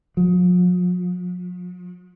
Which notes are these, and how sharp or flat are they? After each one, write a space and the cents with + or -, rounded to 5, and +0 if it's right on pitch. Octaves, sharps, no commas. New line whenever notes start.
F3 +45